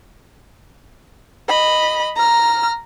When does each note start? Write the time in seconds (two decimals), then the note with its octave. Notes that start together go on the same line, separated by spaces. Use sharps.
1.48 D#5 B5
2.16 A#5 F6